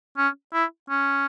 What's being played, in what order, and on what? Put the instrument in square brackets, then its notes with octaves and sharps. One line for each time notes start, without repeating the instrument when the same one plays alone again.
[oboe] C#4
E4
C#4